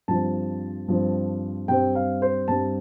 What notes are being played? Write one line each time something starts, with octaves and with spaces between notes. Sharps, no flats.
G2 F3 C4 A5
G2 F3 C4
G2 G3 C4 G5
F5
C5
G2 G3 C4 A5